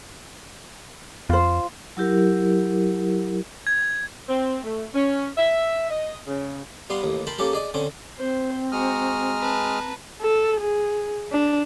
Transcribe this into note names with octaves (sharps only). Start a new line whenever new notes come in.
F2 F4 C5
F#3 E4 G4 A#4
G#6
C4
A3
C#4
E5
D#5
C#3
G3 B3 F5 C6
A1 D#2
A#4 G5 A5 B5 C6
A#3 C#4 G4 A4 A#4
G#4 D5 D#5
D3 C4 C#4
C4 C5
G#3 F#4 A#5 D#6 F6
B4 A5
A4
G#4
D4